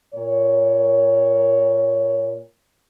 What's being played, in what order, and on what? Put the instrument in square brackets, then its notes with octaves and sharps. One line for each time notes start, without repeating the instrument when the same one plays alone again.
[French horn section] A#2 A#4 C#5